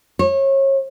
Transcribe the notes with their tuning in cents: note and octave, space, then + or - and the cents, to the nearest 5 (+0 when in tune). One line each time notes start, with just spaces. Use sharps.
C#5 -30